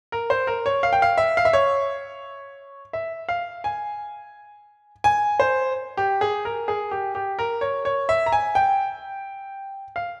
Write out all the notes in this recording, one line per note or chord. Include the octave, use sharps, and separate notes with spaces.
A#4
C5
A#4
C#5
F5
G5
F5
E5
F5
E5
C#5
E5
F5
G#5
G#5
C5
G4
G#4
A#4
G#4
G4
G4
A#4
C#5
C#5
E5
A#5
G#5
G5
F5